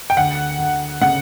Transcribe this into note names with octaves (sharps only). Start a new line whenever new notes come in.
G5
D2 F#5
D2
C#3 F#5